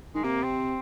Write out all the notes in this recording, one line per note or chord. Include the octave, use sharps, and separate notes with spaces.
D#3 G#3
C3 A#3
C4